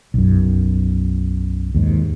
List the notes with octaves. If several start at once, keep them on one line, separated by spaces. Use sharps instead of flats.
B1 F#2
D#2 G#2